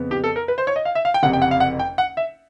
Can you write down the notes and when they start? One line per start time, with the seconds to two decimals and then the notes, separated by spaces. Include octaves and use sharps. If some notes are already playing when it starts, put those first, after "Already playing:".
Already playing: F2 C#3 B3
0.11 G4
0.24 A4
0.36 A#4
0.48 B4
0.58 C5
0.67 C#5
0.76 D#5
0.85 F5
0.95 E5
1.05 F5
1.14 G5
1.23 F#1 F2 C3 F#5
1.33 G5
1.42 F#5
1.51 F5
1.60 F#5
1.79 G5
1.98 F#5
2.17 E5